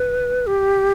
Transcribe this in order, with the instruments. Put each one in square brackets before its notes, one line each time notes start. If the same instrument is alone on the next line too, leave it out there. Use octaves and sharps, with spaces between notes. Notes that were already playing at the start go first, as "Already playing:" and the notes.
Already playing: [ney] B4
G4